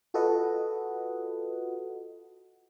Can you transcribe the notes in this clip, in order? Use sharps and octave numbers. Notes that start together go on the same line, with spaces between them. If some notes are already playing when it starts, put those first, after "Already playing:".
F4 F#4 A4 B4 D#5 F#5